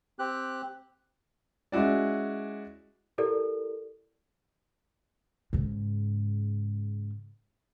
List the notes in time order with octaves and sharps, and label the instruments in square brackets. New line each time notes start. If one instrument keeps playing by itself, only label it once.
[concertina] C4 G4 F#6
[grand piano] G#3 C#4 E4 F#4 D5
[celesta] E4 G4 A4 A#4 D5
[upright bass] G#2 C#3